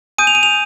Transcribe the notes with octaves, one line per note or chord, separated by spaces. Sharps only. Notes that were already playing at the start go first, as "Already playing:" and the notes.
G#5 D#6 G6 D#7
F7
D#7
F7